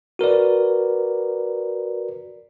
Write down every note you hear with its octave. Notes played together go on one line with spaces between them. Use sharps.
F#4 A#4 B4 D5